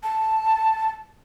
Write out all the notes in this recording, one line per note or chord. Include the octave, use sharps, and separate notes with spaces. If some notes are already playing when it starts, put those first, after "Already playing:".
A5